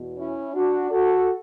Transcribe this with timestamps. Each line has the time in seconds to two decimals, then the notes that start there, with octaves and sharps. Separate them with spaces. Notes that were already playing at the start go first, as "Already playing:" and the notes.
Already playing: E2 B2
0.17 C#4 E4
0.54 D4 F#4
0.91 F#4 A4